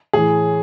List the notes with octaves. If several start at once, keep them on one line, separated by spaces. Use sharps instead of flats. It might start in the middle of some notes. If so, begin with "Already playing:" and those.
A2 E3 G#4